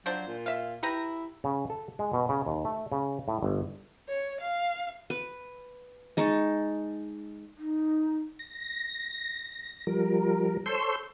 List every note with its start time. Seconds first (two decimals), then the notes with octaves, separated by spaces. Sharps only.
0.06 F3 F#3 D4 C5
0.27 A#2
0.46 E5 F5
0.83 E4 G4 B4 A#5
1.44 C#3
1.70 A4
1.99 G#3
2.13 B2
2.29 C#3
2.46 D#2
2.65 A3
2.92 C#3
3.28 A2
3.42 G1
4.08 C#5
4.40 F5
5.10 B4
6.17 G#3 D#4 A5 C#6
7.58 D#4
8.39 A#6
9.87 F3 G3 A#4
10.66 A4 C5 C#5 C6 E6 G6